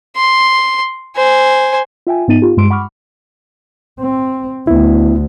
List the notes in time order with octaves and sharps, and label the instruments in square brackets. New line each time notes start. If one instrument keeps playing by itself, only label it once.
[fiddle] C6
C5 G#5
[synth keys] F4 E5 G5 G#5
G#2 B3 D#4 A6 D#7
F4 G4
G2 G#3 C6 D7
F#5 B5 C#6 D6 F6
[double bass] C4
[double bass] D2 [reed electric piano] B3 E4